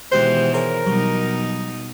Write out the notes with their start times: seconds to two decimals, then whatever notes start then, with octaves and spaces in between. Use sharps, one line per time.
0.12 B2 D#3 E3 G#3 G4 C5 F#6
0.54 G#4 A#4 C5 C#5
0.86 B2 F#3 G3 D#4